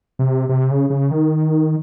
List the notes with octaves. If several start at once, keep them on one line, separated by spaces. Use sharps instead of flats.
C3
C3
C#3
C#3
D#3